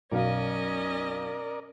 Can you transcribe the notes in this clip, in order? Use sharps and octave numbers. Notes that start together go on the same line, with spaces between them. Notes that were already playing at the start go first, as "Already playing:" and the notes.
B1 F#2 C#4 A#4 D5 D#5 F5